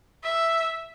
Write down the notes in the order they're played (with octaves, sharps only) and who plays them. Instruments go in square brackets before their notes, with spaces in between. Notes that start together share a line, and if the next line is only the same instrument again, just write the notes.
[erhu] E5